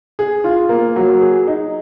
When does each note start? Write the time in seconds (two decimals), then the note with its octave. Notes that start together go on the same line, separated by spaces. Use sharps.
0.19 G#4
0.44 F4
0.69 A#3
0.96 F#3
1.21 G#4
1.47 D#4